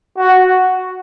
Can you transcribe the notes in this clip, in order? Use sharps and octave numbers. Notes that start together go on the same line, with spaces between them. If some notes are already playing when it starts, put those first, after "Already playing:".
F#4